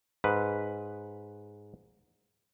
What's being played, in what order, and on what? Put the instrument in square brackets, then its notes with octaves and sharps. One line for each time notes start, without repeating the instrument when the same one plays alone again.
[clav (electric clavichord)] G#2 B4